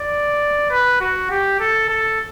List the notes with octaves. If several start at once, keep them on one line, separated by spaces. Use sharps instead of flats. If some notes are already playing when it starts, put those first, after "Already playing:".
Already playing: D5
B4
F#4
G4
A4
A4